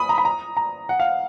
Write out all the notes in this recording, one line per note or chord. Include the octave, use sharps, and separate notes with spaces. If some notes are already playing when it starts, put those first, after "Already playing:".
Already playing: B5 D#6
A#5
B5
A#5
A#5
F#5
F5